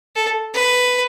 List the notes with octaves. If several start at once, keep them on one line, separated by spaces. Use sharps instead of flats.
A4
B4